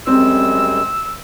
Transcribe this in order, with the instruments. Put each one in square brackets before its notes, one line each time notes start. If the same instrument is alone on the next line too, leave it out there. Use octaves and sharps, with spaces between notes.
[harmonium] F#2 G3 G#3 [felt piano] C4 [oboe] E6